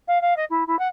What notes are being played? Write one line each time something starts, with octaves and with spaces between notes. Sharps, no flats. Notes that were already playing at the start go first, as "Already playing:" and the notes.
F5
F5
D#5
E4
E4
F#5